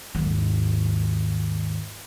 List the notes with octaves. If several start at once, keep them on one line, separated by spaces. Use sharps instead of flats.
D#2 G#2